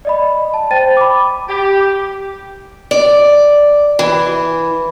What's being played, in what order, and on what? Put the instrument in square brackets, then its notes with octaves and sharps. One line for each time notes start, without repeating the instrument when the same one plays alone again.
[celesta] D5 D#5 B5
A5
C5 G5 A6 D#7
B5 D6
[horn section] G4
[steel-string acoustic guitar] D5
E3